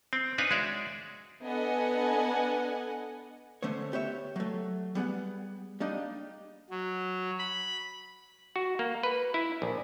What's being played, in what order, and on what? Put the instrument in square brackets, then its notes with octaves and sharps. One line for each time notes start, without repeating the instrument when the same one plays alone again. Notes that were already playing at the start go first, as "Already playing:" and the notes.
[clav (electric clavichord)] C4
D4 D#4 B4 F5 G#5
G#3 F#4 G#4 C#5 D5 E5
[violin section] B3 D4 A4 D#5 F#5 G#5
[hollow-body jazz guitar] D3 A3 C#4 C5 C#5
B3 G4 C#5 E5
F#3 A3
G3 B3 G#4 F#5
G3 A#3 D4 D#4
[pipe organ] F#3
B5
[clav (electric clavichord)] F#4
A#3
B4
E4
A#1